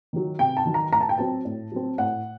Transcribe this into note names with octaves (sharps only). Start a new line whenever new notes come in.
D#3 F#3
C3 G5
A5
D#3 F#3
A#5
A2 A#5
A5
G5
F#3 C4 A5
A2
F#3 C4
A2 F#5